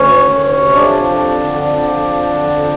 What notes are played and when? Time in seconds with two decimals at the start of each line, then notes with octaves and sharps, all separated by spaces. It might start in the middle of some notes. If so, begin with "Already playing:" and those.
Already playing: D2 C#4 C#5
0.09 D#3
0.30 D2
0.52 C3
0.73 F2 D4 D5
0.96 F3
1.17 F2
1.40 D3
1.60 F2 D4 D5
1.83 F3
2.04 F2
2.26 D3
2.47 F2